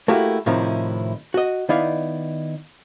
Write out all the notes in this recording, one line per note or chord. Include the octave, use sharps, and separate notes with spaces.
A3 A#3 E4 F#4 G4
A2 C3 D#3 F3 D#4 E4
F#4 D#5
D#3 B3 D#4 E4 D5 F5